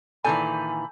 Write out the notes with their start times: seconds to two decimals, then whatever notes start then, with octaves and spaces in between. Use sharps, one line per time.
0.25 A#2 D#3 E3 A4 G#5 A5 B5 G6